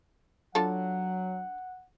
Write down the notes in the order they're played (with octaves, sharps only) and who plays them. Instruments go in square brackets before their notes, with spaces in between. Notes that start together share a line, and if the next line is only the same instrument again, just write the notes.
[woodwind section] F#3 [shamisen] D4 F4 A4 [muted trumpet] F#5